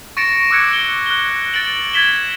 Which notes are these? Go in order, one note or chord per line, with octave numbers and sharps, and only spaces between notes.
C#6 A6 A#6 C#7 D7 E7
D6 E6 F#6 G#6 C#7 D7
G7
F#6 G7
A6 D7 F#7
G#6 A6 B6 E7 G7